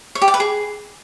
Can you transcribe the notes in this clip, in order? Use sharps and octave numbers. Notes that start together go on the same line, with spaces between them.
C#5
G4
D5
B4
G#4